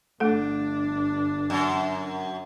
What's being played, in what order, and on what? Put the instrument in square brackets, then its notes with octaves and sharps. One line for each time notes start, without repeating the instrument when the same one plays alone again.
[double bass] G1 D4 [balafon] A3 A4
[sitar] F#2